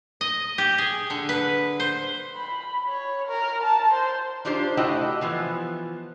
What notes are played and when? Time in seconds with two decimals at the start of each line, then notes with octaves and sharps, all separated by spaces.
0.21 D#5
0.58 G4
0.78 G#4
1.10 D3
1.29 B4
1.80 C5
2.36 B5
2.88 C#5
3.27 A#4
3.63 A5
3.93 C5
4.45 D4 D#4 F4 G4 C5
4.77 A3 E4 F#4 G4 D#5 G5
5.21 E3 F3 B3